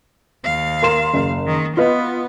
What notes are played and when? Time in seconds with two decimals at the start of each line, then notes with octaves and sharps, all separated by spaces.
0.44 D#2 F5
0.82 A#4 C6 E7
1.14 F#1
1.47 D#3
1.77 B3 F4 B4 D#5